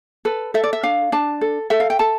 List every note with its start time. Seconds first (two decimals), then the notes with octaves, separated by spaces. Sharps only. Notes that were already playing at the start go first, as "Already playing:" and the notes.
0.25 A4 B4
0.54 A4 E5
0.64 D5
0.73 E5
0.83 D4 F5
1.12 D4 A5
1.41 A4
1.70 A4 E5
1.80 F5
1.90 G5
1.99 A4 A5